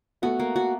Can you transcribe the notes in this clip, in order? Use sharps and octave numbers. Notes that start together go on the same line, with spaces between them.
A3 B3 F#4
A#3
F#4